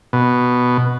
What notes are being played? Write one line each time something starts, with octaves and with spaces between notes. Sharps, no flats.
B2